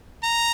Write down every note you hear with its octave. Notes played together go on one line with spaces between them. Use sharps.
A#5